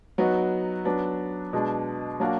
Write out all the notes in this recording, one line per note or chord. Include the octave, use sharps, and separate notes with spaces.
F#3 B3 D#4 F#4
F#3 B3 D4
B2 G#3 D4
F#3 A#3 D4 F#4